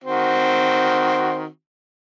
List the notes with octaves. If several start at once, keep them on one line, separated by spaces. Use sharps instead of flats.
D#3 C4 F#4